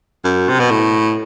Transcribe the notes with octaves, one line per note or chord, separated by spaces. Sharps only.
F#2
C3
B2
A2